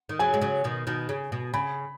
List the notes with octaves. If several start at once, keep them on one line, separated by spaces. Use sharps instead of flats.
D#3
C#3 F#3 G#5
G#3
C#3 F#3
B2 D#3
B2 D#3
C#3
B2
C#3 B5